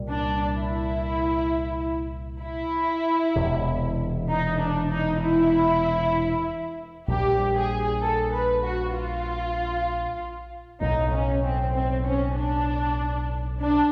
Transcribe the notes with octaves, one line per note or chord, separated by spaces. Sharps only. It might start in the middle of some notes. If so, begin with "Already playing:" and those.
Already playing: C2 A#2 G3
D4
E4
E4
E1 E2 C3
D#4
D4
D#4
E4
A#1 A#2 G3 G4
G#4
A4
B4
F#4
F4
B1 A2 F#3 D#4
C#4
C4
C4
C#4
D4
D4